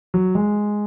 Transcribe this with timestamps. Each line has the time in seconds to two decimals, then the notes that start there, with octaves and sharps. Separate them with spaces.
0.14 F#3
0.35 G#3